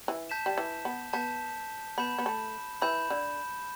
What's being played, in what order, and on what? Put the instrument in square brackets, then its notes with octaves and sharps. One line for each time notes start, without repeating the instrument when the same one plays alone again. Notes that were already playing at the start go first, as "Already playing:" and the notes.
[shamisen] E3
[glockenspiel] A5 G6 B6 E7
[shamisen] G3
E3
B3
[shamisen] B3 [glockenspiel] A5 G6 B6 E7
[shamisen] B3 [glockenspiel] B5 G6 E7
[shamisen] B3
A3
[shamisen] E3 [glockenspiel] B5 G6 E7
[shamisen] D3